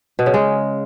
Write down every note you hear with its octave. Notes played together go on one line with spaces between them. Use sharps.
B2
C#3
G#3